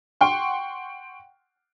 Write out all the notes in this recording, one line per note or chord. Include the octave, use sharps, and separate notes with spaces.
F#5 G5 C6 C#6